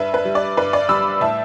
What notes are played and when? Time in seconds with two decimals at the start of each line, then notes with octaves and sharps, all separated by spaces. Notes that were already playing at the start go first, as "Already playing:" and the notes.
Already playing: G2 B4 E5
0.14 B4
0.25 G3
0.35 D5
0.57 G2 B4
0.73 D5
0.89 G3 B5 E6
1.21 A2 E5 A5